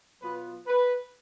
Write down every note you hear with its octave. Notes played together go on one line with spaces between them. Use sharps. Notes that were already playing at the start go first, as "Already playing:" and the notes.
B2 F#3 B3 F4 B4
B4